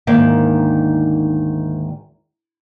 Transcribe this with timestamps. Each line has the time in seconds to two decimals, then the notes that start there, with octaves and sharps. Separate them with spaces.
0.07 D2 G#2 D#3 A#3